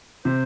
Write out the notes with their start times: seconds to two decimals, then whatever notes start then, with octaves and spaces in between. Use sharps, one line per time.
0.25 C3 C5